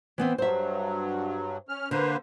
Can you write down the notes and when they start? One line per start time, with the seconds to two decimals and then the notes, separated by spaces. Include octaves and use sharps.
0.18 E3 B3 C4
0.38 G2 F#3 C5 E5
1.69 C#4 F6
1.91 D3 A#3 B4 C5